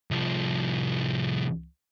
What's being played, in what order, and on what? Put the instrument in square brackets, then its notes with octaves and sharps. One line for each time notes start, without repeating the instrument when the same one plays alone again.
[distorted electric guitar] C2 F3